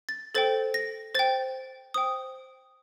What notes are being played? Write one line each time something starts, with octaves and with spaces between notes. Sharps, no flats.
A6
A4 C5 G5 A6
A#6
C5 G5 A6
C5 G5 D#6